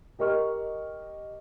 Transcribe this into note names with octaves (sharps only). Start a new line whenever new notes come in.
G4 A#4 D#5 C#6 F6